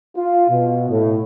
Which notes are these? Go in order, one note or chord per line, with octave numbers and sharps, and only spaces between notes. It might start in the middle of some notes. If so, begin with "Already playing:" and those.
F4
B2
A2